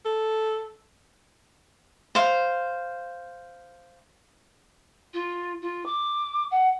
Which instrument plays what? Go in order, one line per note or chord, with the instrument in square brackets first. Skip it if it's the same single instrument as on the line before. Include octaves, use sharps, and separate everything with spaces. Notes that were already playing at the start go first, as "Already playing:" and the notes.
[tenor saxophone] A4
[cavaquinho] C5 F5
[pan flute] F4
F4
D6
F#5